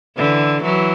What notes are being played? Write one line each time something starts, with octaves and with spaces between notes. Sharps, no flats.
D3 E3
E3 F#3